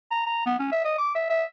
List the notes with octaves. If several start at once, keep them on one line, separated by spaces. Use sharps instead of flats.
A#5
A#5
B3
C#4
E5
D#5
D6
E5
E5